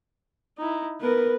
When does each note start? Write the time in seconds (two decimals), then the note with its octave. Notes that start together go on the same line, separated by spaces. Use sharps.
0.58 D#4 E4
1.01 B3 A#4 B4